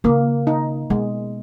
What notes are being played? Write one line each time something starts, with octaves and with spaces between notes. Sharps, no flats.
C#3 A#3
D#4
B2 G#3